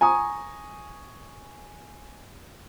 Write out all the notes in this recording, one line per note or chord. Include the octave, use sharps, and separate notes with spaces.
G#5 A#5 C#6 D#6